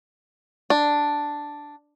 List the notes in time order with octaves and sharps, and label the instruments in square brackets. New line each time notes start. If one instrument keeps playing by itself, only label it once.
[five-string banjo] D4